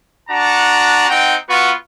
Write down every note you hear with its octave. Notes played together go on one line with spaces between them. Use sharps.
D4 F#4 F#5 A5 A#5
C4 D#4 F#5 G5
B3 F4 F#4 B4 C#6